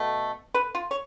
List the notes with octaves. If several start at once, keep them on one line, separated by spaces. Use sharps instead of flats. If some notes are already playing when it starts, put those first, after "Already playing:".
Already playing: B2 A3
B4
F4
C#5